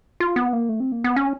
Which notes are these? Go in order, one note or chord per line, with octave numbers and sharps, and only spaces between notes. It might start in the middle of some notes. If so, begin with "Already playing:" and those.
F4
B3
A#3
A3
C4
A#3
B3
C#4